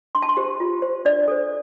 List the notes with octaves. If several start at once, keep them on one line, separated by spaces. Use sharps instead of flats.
D4 C6
A5
C6
G4 C5
F4
C5
D4 D5
A4 C5